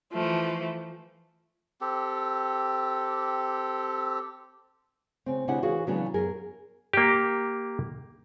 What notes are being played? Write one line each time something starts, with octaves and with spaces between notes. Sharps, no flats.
E3 F3 A3
C4 G4 A4
C#3 C4
C#3 C4 D4 E4 G4 F#5
E3 F#4 G#4 C#5 F5
C#3 E3 F#3 B3 C#4 D4
F#2 G#4 A#4
A#3 G4